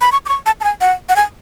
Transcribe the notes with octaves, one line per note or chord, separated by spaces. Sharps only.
B5
C#6
D6
C#6
A5
A5
G#5
F#5
F#5
G#5